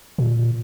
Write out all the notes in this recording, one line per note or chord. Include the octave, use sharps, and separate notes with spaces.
A#2